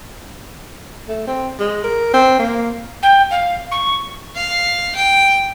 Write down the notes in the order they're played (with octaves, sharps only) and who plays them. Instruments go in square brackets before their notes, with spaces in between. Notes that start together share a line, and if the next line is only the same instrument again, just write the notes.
[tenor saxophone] A3
C4
G#3
A#4
C4
A#3
[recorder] G5
F5
C#6
[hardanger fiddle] F5
G5